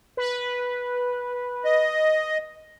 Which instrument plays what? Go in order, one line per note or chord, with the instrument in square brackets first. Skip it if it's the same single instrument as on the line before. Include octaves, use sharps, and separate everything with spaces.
[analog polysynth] B4
[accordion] D#5